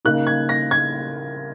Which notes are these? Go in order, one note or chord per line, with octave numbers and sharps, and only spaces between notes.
C#3 A#3 D#4 F#6
G#6
A#6
G#6